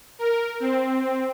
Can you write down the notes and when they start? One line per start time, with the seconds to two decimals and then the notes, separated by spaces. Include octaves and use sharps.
0.19 A#4
0.60 C4